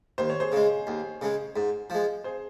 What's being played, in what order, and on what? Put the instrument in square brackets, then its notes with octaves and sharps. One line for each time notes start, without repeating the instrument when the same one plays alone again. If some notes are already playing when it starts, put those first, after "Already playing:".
[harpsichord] D#2 [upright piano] C5
[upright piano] C#5
G#4 C5
[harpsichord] C#3 G#3
D#2
C#3 G#3
G#2
F3 G#3
[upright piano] G#4 C5